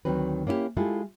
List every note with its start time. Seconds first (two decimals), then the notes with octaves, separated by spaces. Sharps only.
0.05 D2 D#3 F#3 C4 B4
0.47 A#3 C#4 E4 F4 G4
0.77 G#3 E4 F4 G4 A4